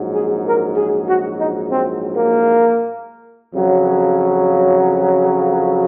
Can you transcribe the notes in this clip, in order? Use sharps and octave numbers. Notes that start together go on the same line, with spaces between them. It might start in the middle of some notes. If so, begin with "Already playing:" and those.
Already playing: A#1 G#2 F#3
G#4
A#4
G#4
F#4
D#4
C4
A#3
F2 C#3 F#3